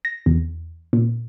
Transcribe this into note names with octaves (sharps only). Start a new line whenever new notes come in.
A#6
E2
A#2